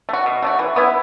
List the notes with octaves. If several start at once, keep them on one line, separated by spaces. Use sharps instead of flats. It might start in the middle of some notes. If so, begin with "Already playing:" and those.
A3
F#4
B2
A3 D4 F#4
E3
B3 E4